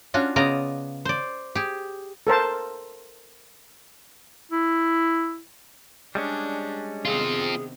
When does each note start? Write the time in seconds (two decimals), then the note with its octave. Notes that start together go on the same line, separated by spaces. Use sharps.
0.14 C#4 D4 F4 F#4
0.36 C#3 B3 F4 D5 D#5 A#5
1.05 C5 D5
1.55 G4 G#4
2.27 A4 A#4 C5 A5
4.52 E4
6.15 G3 G#3 C#4 D4
7.05 C3 D#3 B3 C4 F4 G#4